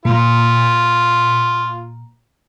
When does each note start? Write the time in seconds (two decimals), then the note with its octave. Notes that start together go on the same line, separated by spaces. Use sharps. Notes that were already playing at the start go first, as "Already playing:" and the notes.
0.05 A#2 F4